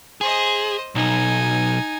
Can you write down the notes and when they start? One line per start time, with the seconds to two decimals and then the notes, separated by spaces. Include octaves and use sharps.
0.21 G#4 C5 D#5
0.95 B1 D#4 G#5